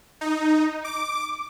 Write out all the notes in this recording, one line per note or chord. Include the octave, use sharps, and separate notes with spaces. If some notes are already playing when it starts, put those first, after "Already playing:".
D#4
D6